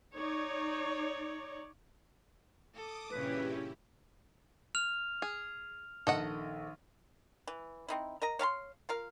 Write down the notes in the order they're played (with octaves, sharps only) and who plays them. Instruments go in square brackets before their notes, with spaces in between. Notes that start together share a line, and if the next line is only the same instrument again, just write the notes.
[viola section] D#4 C#5 D5
[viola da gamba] A4 [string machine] D6 D#6
[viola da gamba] G2 A#2 E3 [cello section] C#3 C#4 [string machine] E4 G4 [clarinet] B4
[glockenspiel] F6 F7
[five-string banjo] G#4
[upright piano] A#1 D#3 [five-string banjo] A4 D#5 F#5
[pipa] E3
C4 D#4 E4
A#4 D#5 A#5
C#5 F5 A5 C6
F4 A#4 F5